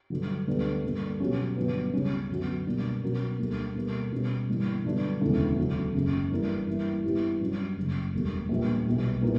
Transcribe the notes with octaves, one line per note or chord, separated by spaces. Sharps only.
G2 D3 F#3
D2 D3 G3 B3 D4
G2 D3 A#3
B2 F#3 C#4 G4
G1 G2 F#3 B3
C#2 C#3 G3 C#4
F#2 D3 F#3 B3 F#4
B2 G3 A#3 D4
B2 F#3 C#4 F#4 A#4
D2 D3 G3 A#3
B2 G3 A#3
B2 G3 C#4
G1 G2 E3 G3 A#3
G2 D3 F#3 B3 D4
E1 D2 C#3 E3
D2 C#3 F#3
F#1 F#2 C#3
G2 E3 A#3 E4 A#4
G2 E3 A#3 E4
G2 E3 B3 E4 G4
G2 F#3 C#4
F#1 F#2 C#3
E1 D2 D3 G3 A#3
A#1 A#2 G3 B3
B1 B2 G3
A#2 G3 B3 E4 A#4